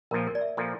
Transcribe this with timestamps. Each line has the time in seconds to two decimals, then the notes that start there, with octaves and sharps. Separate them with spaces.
0.11 A#1 A#2 F3 A#4
0.27 A#4
0.35 D5
0.41 E5
0.57 A#2 F3 A4